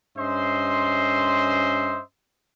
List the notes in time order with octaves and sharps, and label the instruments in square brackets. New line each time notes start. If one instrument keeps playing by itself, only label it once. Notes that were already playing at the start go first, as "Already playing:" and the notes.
[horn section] G2 C#4 C5 D#5 E5 C6